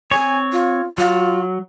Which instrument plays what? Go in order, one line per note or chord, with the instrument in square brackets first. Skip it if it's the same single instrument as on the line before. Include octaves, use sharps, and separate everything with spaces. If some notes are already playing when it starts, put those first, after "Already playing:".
[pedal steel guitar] C4 C#5 [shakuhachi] G#5
[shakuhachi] F4
[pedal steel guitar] F#3 [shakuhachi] F4